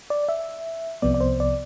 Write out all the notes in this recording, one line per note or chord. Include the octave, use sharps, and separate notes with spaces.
D5
E5
C2 C3 F3 B3 D5
D5
C5
D5